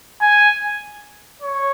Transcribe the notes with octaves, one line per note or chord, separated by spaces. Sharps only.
G#5
C#5